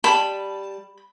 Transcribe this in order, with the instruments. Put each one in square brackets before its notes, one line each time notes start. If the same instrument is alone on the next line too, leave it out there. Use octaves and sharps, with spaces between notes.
[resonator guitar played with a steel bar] G3 A5 [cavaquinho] B5